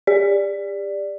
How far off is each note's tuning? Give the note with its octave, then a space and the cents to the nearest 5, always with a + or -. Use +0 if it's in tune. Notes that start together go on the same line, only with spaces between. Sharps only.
G4 +40 D5 +0